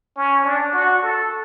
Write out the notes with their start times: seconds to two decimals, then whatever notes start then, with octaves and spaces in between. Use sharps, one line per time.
0.16 C#4
0.44 D4
0.73 F#4
1.02 A4